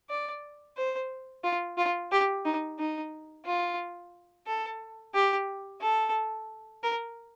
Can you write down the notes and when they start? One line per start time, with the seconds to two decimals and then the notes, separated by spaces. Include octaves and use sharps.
0.10 D5
0.77 C5
1.44 F4
1.78 F4
2.12 G4
2.45 D#4
2.79 D#4
3.46 F4
4.46 A4
5.14 G4
5.81 A4
6.83 A#4